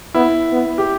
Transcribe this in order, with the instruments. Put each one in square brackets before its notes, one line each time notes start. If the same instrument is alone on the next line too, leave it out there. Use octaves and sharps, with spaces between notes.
[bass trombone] B3 [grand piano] E4
[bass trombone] B3
[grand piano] G4